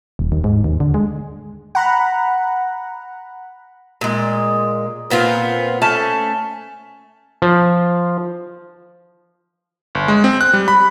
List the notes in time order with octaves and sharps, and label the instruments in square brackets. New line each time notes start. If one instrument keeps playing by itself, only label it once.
[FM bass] D#1
D#2
G#2
D#2
D3
G#3
[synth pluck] F#5 A#5 B5
[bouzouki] A#2 G#3
A#2 B3 C4 F4
A3 C#4 A5
[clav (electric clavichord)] F3
[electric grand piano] G1
G#3
C4
F#6
G3
B5